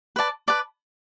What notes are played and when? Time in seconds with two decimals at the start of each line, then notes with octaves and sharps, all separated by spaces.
0.16 B4 D5 A5
0.48 B4 D5 A5